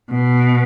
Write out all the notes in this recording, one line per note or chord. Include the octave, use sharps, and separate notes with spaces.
B2